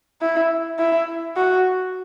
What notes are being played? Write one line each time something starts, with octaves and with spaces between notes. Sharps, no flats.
E4
E4
F#4